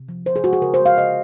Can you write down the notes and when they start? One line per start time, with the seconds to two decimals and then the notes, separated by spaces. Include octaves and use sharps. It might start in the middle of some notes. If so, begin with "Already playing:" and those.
Already playing: C3
0.09 F3
0.26 C#3 C5
0.36 G#4
0.44 G#3 F#4
0.53 G#4
0.62 C#3 A#4
0.74 C5
0.80 G#3
0.86 F5
0.98 C#3 D#5